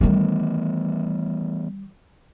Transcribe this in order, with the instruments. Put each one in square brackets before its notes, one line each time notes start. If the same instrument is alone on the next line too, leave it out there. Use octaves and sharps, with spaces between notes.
[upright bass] D#3 G3 [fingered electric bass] E3 A3 B3